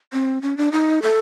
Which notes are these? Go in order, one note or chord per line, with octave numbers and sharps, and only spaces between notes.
C4
C#4
D4
D#4
A4